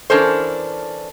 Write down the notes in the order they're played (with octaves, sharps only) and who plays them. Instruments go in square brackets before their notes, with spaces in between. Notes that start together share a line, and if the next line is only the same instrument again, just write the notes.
[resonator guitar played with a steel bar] E3 C#4 D4 A4 A#4 C5